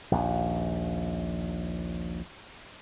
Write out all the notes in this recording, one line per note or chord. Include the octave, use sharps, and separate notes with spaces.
A#1 D#2